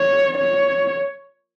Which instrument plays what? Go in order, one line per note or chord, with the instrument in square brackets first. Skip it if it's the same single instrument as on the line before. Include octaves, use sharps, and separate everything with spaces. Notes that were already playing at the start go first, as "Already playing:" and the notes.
Already playing: [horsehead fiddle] C#5
C#5